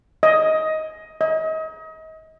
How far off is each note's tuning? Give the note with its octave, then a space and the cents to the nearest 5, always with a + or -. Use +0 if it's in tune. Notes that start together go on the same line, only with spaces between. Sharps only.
D#5 +15
D#5 +35